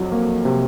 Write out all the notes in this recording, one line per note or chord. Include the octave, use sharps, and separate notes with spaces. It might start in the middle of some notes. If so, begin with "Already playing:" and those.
Already playing: F2 F#3
A#3
C3